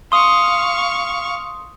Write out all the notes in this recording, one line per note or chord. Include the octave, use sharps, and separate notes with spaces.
F5 C6 C#6 D#6